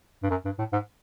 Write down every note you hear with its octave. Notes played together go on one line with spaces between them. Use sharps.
G2
F#2
G2
A2
G#2